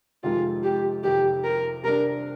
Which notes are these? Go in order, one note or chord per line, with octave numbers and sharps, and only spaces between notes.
F2 C3 D#3 G#3 F4
G4
F2 C3 D#3 G4
A#4
C3 G3 D4 A#4